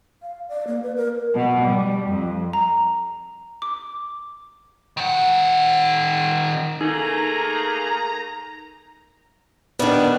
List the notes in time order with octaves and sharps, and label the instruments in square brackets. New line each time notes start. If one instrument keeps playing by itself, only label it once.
[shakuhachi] F5
D5
A#3
B4
A#4
[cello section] B2
G3
F2
[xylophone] A#5
D6
[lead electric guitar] D#3 F#5
[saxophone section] A3 A#3 G#4 [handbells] D#4 [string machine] A#5
[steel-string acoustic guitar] D#3 G3 [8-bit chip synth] B3 D4